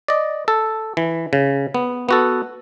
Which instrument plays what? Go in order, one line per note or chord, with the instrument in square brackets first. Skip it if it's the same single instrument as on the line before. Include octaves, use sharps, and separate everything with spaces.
[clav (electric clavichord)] D5 D#5
A4
E3
C#3
B3
B3 F#4 A4